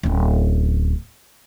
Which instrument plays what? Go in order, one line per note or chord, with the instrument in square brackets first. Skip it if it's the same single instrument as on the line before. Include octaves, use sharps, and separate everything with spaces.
[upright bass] D1 C#4